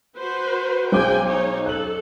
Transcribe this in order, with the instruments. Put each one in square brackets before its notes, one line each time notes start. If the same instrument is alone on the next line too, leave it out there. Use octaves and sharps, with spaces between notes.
[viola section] F#4 B4 C5
[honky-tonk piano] B1 C5 D6 [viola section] G#4 G5 G#5
[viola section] D#4 C#5
[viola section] A4 [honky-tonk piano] F#6 F#7